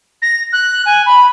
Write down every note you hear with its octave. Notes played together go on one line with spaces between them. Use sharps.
A#6
F#6
G#5
B5